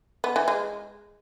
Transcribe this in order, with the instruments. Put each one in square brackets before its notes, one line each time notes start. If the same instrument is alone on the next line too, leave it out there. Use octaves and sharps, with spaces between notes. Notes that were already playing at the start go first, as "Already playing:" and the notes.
[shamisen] B3
E3
G#3